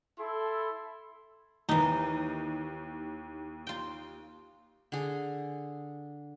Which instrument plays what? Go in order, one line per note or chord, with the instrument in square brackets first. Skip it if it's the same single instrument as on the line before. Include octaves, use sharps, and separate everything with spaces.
[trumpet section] E4 A4 B5 C6
[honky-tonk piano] D#2 [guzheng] E3 D#4
[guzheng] F4 G5
[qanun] D3 G#4